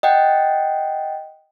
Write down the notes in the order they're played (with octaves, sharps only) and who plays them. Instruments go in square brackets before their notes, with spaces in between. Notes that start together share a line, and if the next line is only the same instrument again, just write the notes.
[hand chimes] D#5 F#5 G5